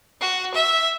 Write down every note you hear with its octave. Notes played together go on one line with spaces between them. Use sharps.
F#4
E5